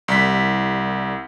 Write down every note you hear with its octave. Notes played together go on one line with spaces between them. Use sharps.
C2 B6